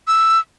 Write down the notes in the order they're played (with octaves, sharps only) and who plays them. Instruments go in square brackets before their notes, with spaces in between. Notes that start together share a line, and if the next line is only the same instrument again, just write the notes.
[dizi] E6